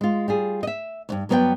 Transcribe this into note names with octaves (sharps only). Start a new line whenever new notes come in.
G#3 F4
G3 F4 G#4
D#5 E5
D2 G2
G2 F#3 B3 B4 D5 G5